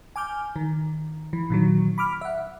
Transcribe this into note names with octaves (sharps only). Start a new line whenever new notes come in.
G#5 D6 F6 G6
D#3
E3
A#2 D#3 F#3
B5 D6 F6
E5 F#5